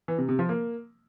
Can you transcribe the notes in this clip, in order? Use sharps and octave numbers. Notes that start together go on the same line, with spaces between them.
E3
C3
C3
F3
A#3